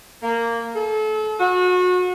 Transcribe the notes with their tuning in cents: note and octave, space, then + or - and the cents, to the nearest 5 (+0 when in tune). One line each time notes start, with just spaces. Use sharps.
A#3 -10
A4 -35
F#4 -30